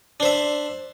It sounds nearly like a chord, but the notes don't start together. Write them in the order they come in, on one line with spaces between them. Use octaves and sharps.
D4 C5 E5